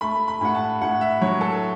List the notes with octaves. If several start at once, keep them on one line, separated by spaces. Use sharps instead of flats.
A3 B5
B5
A2 F#5
A5
A2 F#5
E5
F#3 C#5
A4